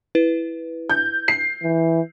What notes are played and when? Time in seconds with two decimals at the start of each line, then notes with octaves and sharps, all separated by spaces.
0.15 E4 B4
0.90 G6
1.28 C7
1.63 E3